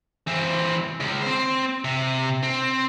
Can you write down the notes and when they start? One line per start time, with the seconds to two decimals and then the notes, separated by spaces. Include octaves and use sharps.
0.27 E3 C4
1.00 C#2
1.23 C4 C5
1.85 C3
2.43 C4